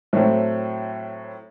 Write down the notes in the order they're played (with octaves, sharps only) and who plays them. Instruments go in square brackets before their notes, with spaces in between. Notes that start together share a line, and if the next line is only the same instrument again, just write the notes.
[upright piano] A2 F#3 A3 C4